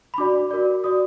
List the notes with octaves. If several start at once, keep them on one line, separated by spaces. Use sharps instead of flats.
B5
D4 F#4 D5 D6
F#4 A#4 D5
F#4 D5 D#6